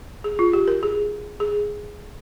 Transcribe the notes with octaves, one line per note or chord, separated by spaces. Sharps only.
G#4
F4
G4
A#4
G#4
G#4